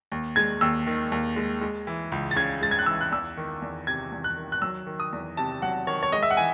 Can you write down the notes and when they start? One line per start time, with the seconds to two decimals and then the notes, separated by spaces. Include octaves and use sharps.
0.12 D#2
0.36 G#3 G#6
0.61 D#2 E6
0.87 D#3
1.12 D#2
1.36 G#3
1.61 G#3
1.87 E3
2.12 C#2
2.31 A6
2.36 C#3 G#6
2.61 G#3 A6
2.71 G#6
2.79 F#6
2.86 E3 E6
3.01 F#6
3.12 E2 E6
3.37 D#3
3.62 E2
3.87 C3 G#6
4.12 E2
4.24 F#6
4.37 D#3
4.52 F#6
4.62 F#3 E6
4.87 D#3
5.00 D#6
5.13 E2
5.37 C3 A5
5.62 F#3 F#5
5.87 D#3 C#5
6.03 C#5
6.12 G#3 D#5
6.23 E5
6.31 F#5
6.37 E3 G#5